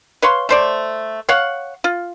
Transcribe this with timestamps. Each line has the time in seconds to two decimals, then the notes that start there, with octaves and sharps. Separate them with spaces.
0.22 B4 C#5 F5 C6
0.49 A3 C5 D5
1.29 C#5 F5 F#5
1.84 F4